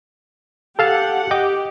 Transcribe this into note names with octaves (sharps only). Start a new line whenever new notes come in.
G4 A4 F5 F#5 A5
G4 D#5 G5 D6